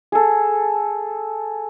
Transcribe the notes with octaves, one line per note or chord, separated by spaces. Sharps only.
G#4 A4